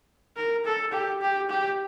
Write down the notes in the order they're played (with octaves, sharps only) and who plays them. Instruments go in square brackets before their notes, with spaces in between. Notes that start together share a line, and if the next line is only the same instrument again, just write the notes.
[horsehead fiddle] A#4
A4
G4
G4
G4